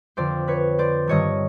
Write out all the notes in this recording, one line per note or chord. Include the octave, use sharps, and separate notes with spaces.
F2 D3 C5 D5
B4 C#5
C5 D5
G2 D#3 C#5 D#5